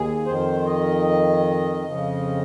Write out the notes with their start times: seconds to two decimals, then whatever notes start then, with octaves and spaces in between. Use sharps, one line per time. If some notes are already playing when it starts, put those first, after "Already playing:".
Already playing: D#2 G#4
0.26 F2 D#3 C5
0.66 D#5
1.85 F2 C#3 F3